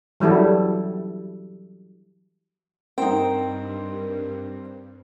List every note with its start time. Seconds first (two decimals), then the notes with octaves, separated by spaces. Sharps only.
0.20 E3 F#3 G3 E4 A4
2.98 G2 C4 D#4 A#4 G5